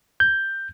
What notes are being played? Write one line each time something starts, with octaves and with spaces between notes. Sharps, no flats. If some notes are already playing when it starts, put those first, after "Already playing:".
G6